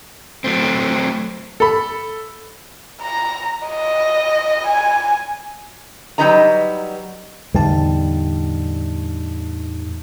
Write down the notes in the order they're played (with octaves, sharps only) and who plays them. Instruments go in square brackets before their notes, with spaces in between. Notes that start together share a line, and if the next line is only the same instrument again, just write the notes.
[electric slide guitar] F#3 A3 C4
[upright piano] A4 B5
[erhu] A#5
D#5
G#5
[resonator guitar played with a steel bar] F#3 G3 D#4 B4 D#5 A#5
[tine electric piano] E2 D#4 A5 [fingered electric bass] A2 D3 G3